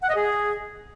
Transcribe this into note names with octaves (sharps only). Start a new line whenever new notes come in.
F#5
D#5
G#4